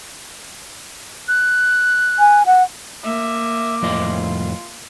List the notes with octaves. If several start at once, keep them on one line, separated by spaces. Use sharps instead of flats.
F#6
G#5
F#5
A#3 E5 D6
F2 A2 F4 D#5